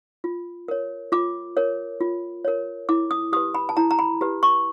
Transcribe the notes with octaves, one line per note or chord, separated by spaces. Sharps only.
F4
A#4 C#5
F4 D6
A#4 C#5
F4
A#4 C#5
E4 D6
D#6
G4 B4 D#6
B5
A5
E4 A#5
A#5
B5
G4 B4
C#6